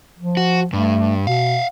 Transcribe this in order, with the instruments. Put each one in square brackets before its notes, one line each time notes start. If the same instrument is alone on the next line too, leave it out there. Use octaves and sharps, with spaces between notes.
[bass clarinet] F3
[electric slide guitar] F#4
[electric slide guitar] G2 [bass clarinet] A3
[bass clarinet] B2 [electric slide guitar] F5 F#5